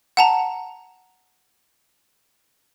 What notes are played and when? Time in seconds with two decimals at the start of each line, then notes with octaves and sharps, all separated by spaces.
0.17 F#5 A5 A#5